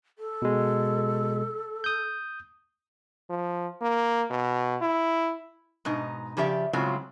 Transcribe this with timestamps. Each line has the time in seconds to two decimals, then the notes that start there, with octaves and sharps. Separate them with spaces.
0.19 A4
0.42 B2 G#3
1.84 D#6 G6
3.30 F3
3.82 A#3
4.31 B2
4.81 E4
5.85 G#2 B2 D#4
6.37 C#3 F3 G4 D5 E5
6.73 A2 C#3 F#3 G#3 C4 F4